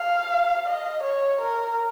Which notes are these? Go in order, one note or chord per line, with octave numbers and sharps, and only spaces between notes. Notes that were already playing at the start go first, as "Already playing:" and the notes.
Already playing: F5
D#5
C#5
A#4